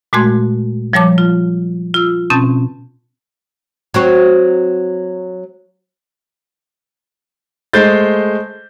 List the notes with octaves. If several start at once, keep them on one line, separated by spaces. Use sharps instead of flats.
A#2 G#3 A3 F#4 C6 G#6
F3 G3 C#5 A5 D6
F4
F4 E6
B2 C4 C#4 A5 G6 A6
F#3 C4 F#4
G#3 A3 C5 G6 A6